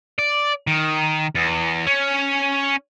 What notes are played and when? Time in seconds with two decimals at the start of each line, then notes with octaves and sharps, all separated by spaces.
0.19 D5
0.67 D#3
1.35 E2
1.86 C#4